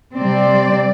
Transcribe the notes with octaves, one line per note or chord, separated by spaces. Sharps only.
C3 G3 C4 D5